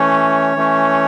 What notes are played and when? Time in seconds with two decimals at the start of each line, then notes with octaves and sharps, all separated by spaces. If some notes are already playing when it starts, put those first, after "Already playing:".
Already playing: E3 A3 C#4 C#5
0.56 E3 A3 C#4